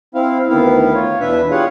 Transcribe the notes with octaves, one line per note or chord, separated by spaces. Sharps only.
C4 E4 F5
D2 D#3 B3 E4 F5
F4 C#5
E2 B2 D4 B4 E5
G3 F4 G#4 C#5 F5 F#5